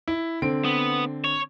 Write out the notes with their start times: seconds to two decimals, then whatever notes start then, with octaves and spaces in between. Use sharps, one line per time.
0.08 E4
0.42 D3 C4 D7
0.65 B3
1.24 C#5